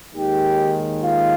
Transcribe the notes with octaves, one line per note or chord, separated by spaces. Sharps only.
D#2 D#3 G#3 G4
F4